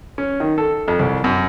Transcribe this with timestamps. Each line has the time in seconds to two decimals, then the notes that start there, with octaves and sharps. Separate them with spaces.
0.18 C#4
0.40 D#3
0.58 A4
0.88 F2
0.99 C2
1.24 F#2